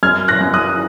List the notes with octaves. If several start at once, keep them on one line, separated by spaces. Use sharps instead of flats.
F#2 F6 G#6
F#6 A#6
F#2
D#6 F#6